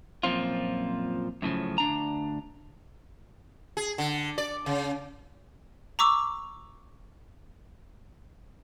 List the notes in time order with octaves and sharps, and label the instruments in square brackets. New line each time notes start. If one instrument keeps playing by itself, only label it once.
[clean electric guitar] F#2 A#2 F3 C4 F4
F#2 A2 C#3 F3
D2 D4 A#5
[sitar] G#4
D3
D5
C#3
[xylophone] A#5 C#6 D6 E6